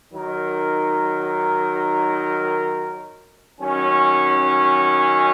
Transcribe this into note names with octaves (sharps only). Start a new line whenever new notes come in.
D#3 F#3 D#4 A#4
D#3 F#3 C#4